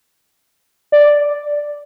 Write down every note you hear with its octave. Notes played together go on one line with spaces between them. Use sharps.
D5